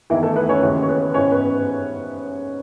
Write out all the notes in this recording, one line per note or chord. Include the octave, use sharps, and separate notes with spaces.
E2 D#3 E3 E4
A3 A4
B3 B4
C#4 C#5
D#2 C#3 E3
C#5
B3 B4
G#2 E3 C#4 C#5
B3 B4